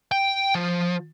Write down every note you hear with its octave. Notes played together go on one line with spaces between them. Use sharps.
G5
F3